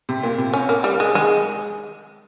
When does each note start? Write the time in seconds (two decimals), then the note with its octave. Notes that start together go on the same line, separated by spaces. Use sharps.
0.09 C3
0.23 A#2
0.38 C3
0.53 C#4
0.69 A#3
0.84 G3
1.00 G#3
1.15 D#3 G#3